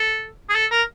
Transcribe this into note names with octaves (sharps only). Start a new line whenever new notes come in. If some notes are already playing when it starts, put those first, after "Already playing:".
Already playing: A4
G#4
A4
A#4